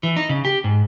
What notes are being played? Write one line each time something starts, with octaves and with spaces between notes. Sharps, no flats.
E3
D#4
C#3
G4
G#2